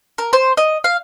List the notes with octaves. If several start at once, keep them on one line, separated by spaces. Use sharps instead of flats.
A#4
C5
D#5
F5